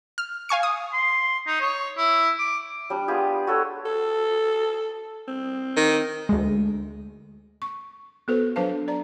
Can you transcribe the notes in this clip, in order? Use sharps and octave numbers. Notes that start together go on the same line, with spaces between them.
F6
F5 G#5 C#6 C#7
D#6
C6
D#4
C#5
E4
D6
G3 D4
B3 F4 G4 G#4
F#4 A4 C#5
A4
C4
D#3
D2 G#3
C#6
B3 F#4 A4 B4 C5
F#3 D4 B4 C5 F5 A5
D5 A#5